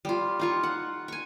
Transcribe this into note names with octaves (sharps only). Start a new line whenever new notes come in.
G3 F4
D#4 F4 C#6
F#5
G#5 C#6